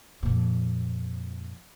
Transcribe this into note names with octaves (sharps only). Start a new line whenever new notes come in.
F2 A#2